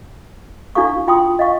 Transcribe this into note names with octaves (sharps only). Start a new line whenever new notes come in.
D4 E4 F#4 A4 F5 C#6
F4 G5 C6 D#6
D#5 F5 C#6